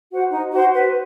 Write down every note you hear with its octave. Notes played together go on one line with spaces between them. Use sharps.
F#4 C5 F#5
D#4
F#4 C5 F#5
B4